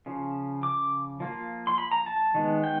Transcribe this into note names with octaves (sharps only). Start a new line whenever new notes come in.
C#3 F3
D6
F3 A#3 F4
C6
B5
A#5
A5
D#3 G#3 B3
G5